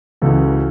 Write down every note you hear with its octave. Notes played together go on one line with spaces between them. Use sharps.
C#2 C#3 E3 F#4 A4